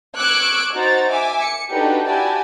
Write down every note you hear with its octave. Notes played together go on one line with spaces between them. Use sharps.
C#6 D6 E6 F#6 G#6 D7
D#4 F#4 C5 A#5 A6
E5 G#5 D6
C#7
D4 D#4 F#4 G4 A4 B4
E4 F#4 G4 D5 G#5 A5